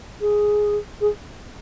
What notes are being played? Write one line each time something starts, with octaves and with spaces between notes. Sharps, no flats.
G#4
G#4